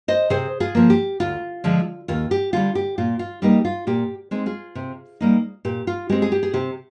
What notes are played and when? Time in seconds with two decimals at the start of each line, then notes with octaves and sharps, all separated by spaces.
0.08 C5 D#5
0.30 C3 G#4 C5
0.60 F4 G#4
0.75 F3 A#3
0.90 G4
1.20 D2 F4
1.64 D3 F3 G#3
2.08 D#2 F4
2.31 G4
2.53 D3 G3 F4
2.75 G4
2.98 A#2 F4
3.19 F4
3.42 G3 A#3 D#4 G4
3.65 F4
3.87 A#2 G4
4.31 G#3 C4 D#4
4.46 F4 G#4
4.75 C3
5.21 G3 A#3 D#4
5.65 A#2 G4
5.87 F4
6.09 G#3 C4 G4
6.22 G#4
6.32 G4
6.43 G#4
6.53 C3 G4